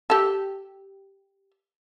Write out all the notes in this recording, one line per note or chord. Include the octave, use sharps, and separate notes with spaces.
G4 A4